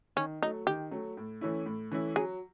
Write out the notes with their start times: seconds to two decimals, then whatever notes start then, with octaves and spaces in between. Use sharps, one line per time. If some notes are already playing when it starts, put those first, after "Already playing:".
0.16 D#3 C#4
0.42 F#3 A3 D#4
0.67 D#3 G4
0.91 F#3 A3
1.17 A2
1.41 E3 A3 C#4 E4
1.66 A2
1.91 E3 A3 C#4 E4
2.16 F#3 G#4